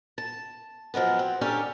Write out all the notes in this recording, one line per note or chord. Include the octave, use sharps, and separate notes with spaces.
A5
F3 F#3 G#3 B3
C4
C#4 D4 G4 A4 A#4 C#5